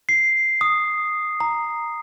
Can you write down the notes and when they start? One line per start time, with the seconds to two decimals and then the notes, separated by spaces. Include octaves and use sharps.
0.09 C7
0.61 D#6
1.40 A#5